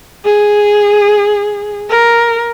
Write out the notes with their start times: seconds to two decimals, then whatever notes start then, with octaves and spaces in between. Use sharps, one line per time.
0.25 G#4
1.90 A#4